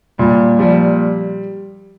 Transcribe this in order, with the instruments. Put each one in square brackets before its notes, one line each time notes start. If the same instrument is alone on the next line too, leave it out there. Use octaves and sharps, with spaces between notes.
[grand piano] A#2 [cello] G3
[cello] F3 [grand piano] G3